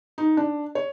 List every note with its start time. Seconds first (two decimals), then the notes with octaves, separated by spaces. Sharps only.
0.18 D#4
0.37 D4
0.75 C#5